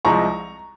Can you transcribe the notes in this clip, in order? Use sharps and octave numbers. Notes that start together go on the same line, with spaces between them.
C2 C3 F3 G#3 C4 A#5 C#6